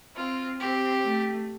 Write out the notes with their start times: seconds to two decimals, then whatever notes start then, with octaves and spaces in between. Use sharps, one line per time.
0.16 C4 F4
0.60 C4 G4
1.04 A3